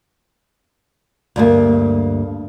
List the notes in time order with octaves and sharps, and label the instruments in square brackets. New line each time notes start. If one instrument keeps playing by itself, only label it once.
[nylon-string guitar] D2 G2 A#3